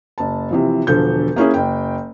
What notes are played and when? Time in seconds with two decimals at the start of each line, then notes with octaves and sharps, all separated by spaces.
0.18 F#1 A5
0.51 C3 E3 F3
0.87 E1 D3 F3 A4 G6
1.36 A#3 C#4 E4 G#4
1.54 F#1 G5